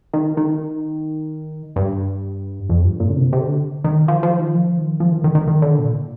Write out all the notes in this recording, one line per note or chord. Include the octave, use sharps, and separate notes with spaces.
D#3
D#3
G2
F2
G2
A#2
D3
C3
C3
D3
D#3
F3
F3
D#3
F3
D#3
F3
D#3
D#3
D#3
D#3
D3
A#2